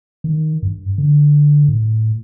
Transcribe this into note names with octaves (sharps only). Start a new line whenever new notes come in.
D#3
G2
D3
A2